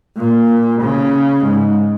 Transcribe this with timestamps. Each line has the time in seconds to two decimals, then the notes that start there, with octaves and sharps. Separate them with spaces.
0.18 A#2
0.82 C#3
1.45 G#2